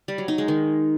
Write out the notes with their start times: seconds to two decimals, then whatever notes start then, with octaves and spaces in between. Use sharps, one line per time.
0.08 G3
0.18 F#3
0.28 D#4
0.38 G#3
0.48 D#3